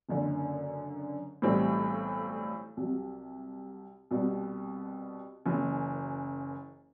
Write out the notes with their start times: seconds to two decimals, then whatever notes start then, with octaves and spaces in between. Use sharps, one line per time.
0.09 F#1 F#2 D3
1.42 B1 A2 E3 G3 C4
2.77 C2 C3 F#3
4.11 C2 B2 G3
5.46 F#1 F#2 E3